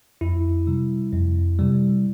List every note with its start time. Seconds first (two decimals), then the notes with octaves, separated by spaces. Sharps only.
0.21 F2 E4
0.67 C3 G3
1.13 F2
1.59 C3 G3